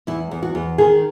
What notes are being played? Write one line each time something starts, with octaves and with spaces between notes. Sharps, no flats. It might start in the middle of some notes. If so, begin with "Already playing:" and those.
E2 E4
E2
F#4
E2
D#3 G#4